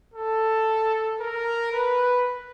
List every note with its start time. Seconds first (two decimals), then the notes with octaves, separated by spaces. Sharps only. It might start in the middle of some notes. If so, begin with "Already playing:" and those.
0.14 A4
1.20 A#4
1.72 B4